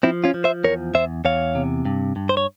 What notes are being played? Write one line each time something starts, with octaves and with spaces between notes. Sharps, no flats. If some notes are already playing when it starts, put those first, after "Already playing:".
F3 C4 E4
C#4 F4
F3
C5 E5
E2 A#4 C#5
E2 C5 E5
E2 C#5 F5
C3
G2
G2
C5
C#5